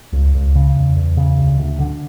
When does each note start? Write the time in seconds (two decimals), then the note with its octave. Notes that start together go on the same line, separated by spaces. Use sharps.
0.13 C#2
0.34 C#2
0.55 C#3
0.76 E2
0.96 E2
1.17 C#3
1.39 D2
1.59 D2
1.80 D3